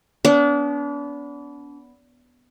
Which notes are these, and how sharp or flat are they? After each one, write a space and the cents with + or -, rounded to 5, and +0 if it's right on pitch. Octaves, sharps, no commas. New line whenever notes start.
B3 +0 D4 -35